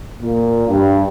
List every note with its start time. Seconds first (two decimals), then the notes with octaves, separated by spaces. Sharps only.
0.21 A#2
0.69 G2